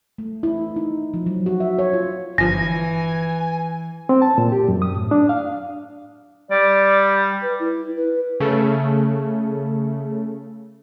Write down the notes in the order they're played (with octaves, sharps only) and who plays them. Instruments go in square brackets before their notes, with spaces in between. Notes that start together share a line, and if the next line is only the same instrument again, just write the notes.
[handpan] A3
E4
D#4
F3
F#3
F#4
E5
C#5
F4
[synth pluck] G1 F3 [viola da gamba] E3 [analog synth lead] G#5 [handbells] A#6
[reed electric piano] C4
A5
A#2
G4
F#2
D#6
A2
D4
F5
[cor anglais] G3 [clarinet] D5
[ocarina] B4
E4
B4
[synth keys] C#3 A3